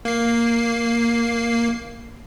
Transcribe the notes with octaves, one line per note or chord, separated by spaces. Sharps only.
A#3 C7